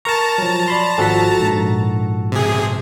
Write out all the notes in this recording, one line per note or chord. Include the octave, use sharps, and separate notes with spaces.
A#4 A5 A#5 C#6
F3 F#3
D5 B5 C6
G#1 F3 F#4 A4 B6
A#1 G#2
C3 G#4